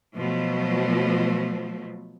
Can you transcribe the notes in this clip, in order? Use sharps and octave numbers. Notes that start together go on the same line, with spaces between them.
B2 F3 F#3 A3